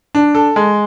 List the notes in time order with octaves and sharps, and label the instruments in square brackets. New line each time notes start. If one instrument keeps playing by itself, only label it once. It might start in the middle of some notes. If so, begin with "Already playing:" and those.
[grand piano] D4
A4
G#3